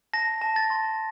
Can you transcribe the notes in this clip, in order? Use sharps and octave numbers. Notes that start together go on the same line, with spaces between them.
A5 A#6
A5
A6
C6